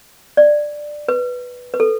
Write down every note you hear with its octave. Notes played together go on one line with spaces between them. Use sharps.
D5
B4
B4
A4